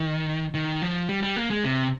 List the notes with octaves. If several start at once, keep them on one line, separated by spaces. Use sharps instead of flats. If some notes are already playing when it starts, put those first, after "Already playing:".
Already playing: D#3
D#3
F3
G3
G3
A#3
G#3
C3